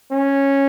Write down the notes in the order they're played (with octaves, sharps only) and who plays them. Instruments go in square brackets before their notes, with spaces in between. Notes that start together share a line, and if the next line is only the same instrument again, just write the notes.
[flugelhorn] C#4